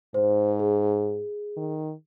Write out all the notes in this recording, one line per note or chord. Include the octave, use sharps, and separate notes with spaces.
G#2 C5
G#4
D#3